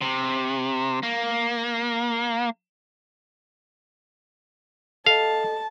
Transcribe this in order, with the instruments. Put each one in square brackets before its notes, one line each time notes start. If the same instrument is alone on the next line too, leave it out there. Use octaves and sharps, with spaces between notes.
[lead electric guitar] C3
A#3
[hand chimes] A4 D#5 [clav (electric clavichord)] F5 [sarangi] A5